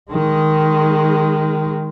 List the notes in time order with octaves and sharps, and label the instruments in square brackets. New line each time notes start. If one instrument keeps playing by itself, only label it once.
[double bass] D#3 G#3